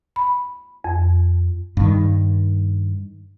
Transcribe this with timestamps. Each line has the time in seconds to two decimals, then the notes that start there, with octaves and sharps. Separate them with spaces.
0.16 B5
0.84 F2
1.77 G2 D#3